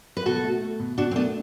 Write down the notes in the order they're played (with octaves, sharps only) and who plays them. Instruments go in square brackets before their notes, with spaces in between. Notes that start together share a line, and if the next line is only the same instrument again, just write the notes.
[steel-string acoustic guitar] B4
[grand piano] B2 [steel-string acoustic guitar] F#4 A4
[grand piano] A3
A3
B2
[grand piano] B2 [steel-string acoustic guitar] D4 F#4
[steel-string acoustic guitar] C4
[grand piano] A3 [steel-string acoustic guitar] B3 D4